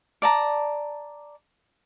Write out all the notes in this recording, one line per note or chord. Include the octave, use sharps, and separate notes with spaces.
D5 A5 A#5